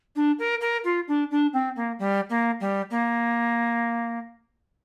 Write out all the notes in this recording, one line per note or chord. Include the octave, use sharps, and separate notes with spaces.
D4
A#4
A#4
F4
D4
D4
C4
A#3
G3
A#3
G3
A#3